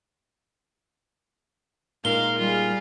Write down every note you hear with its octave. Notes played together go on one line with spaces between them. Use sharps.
A#2 G#3 D#4 A#4 F5 G7
G3 F4 G#4